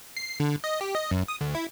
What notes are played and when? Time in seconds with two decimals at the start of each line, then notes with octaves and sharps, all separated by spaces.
0.17 C7
0.40 D3
0.64 D#5
0.81 G4
0.95 D#5
1.11 F#2
1.28 D#6
1.41 D2
1.55 E4